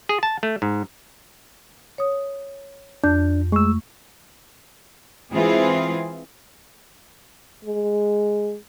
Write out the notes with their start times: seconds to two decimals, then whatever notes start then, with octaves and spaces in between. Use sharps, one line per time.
0.09 G#4
0.23 A5
0.43 A3
0.62 G#2
1.98 C#5 D#6
3.04 F2 D4 G6
3.52 G#3 A3 C#6 E6
5.32 E3 G#3 C4 F4 G#4
7.65 G#3